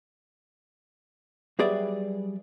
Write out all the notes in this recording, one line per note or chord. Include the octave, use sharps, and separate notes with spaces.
F#3 G3 G#4 B4 D5 E5